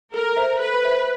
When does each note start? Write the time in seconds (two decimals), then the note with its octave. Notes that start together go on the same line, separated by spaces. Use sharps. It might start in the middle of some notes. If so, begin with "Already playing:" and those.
0.14 A4 A#4
0.36 C5 E5
0.59 A4 B4
0.83 C5 E5